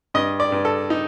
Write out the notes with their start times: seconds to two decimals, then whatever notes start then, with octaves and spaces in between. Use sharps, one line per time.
0.14 G2 D#5
0.40 D5
0.52 G2
0.65 A4
0.90 D#4